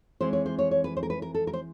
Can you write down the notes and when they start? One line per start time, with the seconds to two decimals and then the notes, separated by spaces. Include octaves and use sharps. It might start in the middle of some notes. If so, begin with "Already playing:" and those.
0.21 E3 G#3 C4 C5
0.33 C#5
0.46 C5
0.59 C#5
0.71 C#5
0.84 B4
0.97 C5
1.03 A#4
1.10 B4
1.22 A#4
1.35 A4
1.47 A#4
1.53 C5